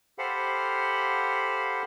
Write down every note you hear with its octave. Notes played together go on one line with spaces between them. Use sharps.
G4 A4 C5 F5 F#5 B5